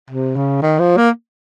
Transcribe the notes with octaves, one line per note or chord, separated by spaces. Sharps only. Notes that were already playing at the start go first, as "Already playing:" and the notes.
C3
C#3
D#3
F3
A#3